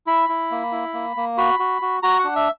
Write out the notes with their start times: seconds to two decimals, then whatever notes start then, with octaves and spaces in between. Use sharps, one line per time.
0.07 E4 B5
0.29 E4
0.51 A#3
0.72 E4
0.94 A#3
1.17 A#3
1.38 F#4 B5
1.59 F#4
1.82 F#4
2.03 F#4 A#5
2.19 D4 F#5
2.36 E5